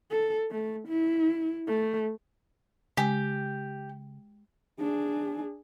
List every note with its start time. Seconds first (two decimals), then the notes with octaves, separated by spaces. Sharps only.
0.10 A4
0.51 A3
0.88 E4
1.67 A3
2.97 C#3 G#3 G4
4.79 D4 G#4